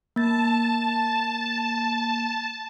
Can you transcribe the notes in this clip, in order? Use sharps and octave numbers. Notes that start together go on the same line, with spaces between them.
A#3 A5 A6